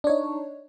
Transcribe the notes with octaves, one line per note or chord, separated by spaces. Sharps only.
D4 D#4 C#5